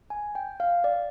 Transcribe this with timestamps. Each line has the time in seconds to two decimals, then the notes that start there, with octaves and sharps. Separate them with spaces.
0.10 G#5
0.35 G5
0.60 F5
0.84 D5